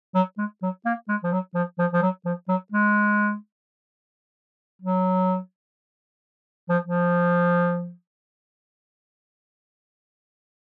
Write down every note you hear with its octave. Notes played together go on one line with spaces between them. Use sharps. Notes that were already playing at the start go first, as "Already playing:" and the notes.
F#3
G#3
F#3
A#3
G#3
F3
F#3
F3
F3
F3
F#3
F3
F#3
G#3
F#3
F3
F3